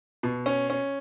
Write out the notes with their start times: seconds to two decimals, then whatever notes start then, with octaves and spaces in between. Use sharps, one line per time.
0.23 B2
0.46 C#4
0.70 C#4